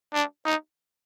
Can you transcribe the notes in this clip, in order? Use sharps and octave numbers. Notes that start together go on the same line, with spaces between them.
D4
D#4